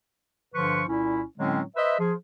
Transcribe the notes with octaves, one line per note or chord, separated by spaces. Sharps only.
G2 D3 F3 B4 C#6
C2 A#2 C#4 E4
A2 D3 F#3 G#3 C4 C#4
B4 C5 D#5 E5
F3 G#4